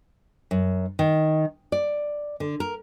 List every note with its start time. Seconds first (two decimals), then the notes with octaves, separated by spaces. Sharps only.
0.51 F#2
0.99 D#3
1.72 D5
2.40 D3
2.60 A#4